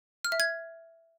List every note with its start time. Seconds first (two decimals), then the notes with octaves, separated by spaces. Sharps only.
0.25 F6
0.32 E5
0.40 G#6